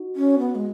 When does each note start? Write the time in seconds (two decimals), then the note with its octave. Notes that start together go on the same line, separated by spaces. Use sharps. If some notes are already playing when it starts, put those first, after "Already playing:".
Already playing: D#4 F#4
0.16 C#4
0.39 B3
0.55 G#3